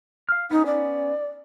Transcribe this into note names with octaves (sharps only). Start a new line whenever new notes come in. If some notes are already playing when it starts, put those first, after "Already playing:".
F5 F6
B3 C#4 D#4
D5